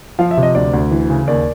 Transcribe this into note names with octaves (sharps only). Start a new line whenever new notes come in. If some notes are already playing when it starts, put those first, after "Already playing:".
F3 F5
E5
C3
D#5
D2 D5
D2
E3
C#3
D#2 D5